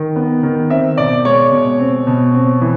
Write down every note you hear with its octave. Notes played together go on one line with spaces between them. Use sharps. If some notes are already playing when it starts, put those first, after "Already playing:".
Already playing: D#3
B3
D#3
C4 E5
B2 D5
G#3 C#5
B2
C4
B2
C4
E3